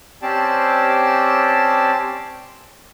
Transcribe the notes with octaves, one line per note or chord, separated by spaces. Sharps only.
C4 C#4 G4 C5 D5 A5